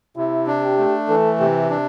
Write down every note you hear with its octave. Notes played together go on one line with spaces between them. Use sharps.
C3 E4
D4
G4
A3
E3 A4
C3 G4
D4